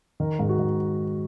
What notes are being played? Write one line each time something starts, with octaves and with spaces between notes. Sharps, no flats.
D#3 A#4
G#2
F#4
G#2